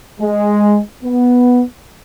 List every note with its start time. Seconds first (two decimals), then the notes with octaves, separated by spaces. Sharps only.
0.21 G#3
1.04 B3